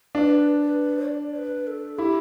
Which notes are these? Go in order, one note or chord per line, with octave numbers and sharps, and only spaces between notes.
D4 B4
B4
D5
B4
A4
E4 G4